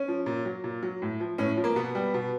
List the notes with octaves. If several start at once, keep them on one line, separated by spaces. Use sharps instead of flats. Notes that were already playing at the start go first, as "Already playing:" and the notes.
Already playing: C#4
F3
A#2
F#3
A#2
F#3
A2
F3
A2 C#4
F3
A#3
B2 B3
G3
B2